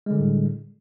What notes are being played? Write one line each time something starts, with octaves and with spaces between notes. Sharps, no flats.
A2 D3 G3 G#3